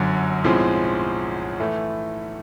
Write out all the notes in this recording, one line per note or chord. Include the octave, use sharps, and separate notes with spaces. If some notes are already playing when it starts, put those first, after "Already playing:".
Already playing: G1 F#2 D3 F#3
B1 A2 F3 G#3 C4
A2 E3 A3